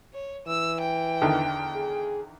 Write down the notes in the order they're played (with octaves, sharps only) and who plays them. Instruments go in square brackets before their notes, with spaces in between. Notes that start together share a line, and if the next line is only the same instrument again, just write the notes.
[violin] C#5
[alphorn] E3 [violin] E6
[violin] G5
[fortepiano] E2 D3 D#3
[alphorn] G#4